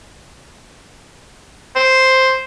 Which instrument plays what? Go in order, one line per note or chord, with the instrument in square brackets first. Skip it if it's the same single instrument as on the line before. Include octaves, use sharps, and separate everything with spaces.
[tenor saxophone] C5